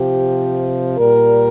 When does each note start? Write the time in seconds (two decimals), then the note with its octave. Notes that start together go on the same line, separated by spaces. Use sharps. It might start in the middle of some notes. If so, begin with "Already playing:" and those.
Already playing: C3 F3 G4
0.99 A#2 G3 A#4